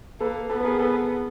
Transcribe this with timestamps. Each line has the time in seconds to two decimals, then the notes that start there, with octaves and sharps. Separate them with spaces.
0.20 A#3 A4 B4
0.50 B3 A4 B4
0.60 B4
0.65 G#4 A#4
0.79 A4 B4